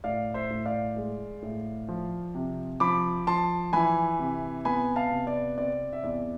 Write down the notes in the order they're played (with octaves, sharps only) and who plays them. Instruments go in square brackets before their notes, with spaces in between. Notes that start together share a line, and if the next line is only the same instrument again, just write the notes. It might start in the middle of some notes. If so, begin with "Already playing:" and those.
[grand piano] A2 D5 F5
C5 E5
A2
D5 F5
G#3
A2
F3
C3
F3 B5 D6
F3 A5 C6
E3 G#5 B5
C3
B3 G#5 B5
F5 A5
C3
D5
C4 D5
E5
E2 D5